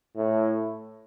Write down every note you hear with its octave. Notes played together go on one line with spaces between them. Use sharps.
A2